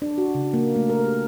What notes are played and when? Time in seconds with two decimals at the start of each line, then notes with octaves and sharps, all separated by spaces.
0.02 D4
0.18 F#4
0.35 C#3
0.54 A#3
0.76 A3
0.90 A#4
1.04 G4